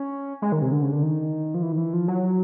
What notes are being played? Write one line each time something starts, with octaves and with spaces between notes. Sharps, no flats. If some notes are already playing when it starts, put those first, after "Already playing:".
Already playing: C#4
G#3
D#3
C3
D3
C#3
D3
D#3
F3
E3
D#3
E3
F3
F#3